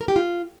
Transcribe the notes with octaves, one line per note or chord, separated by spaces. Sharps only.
A#4
G4
F4